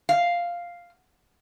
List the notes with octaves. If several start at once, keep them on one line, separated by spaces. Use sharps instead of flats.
F5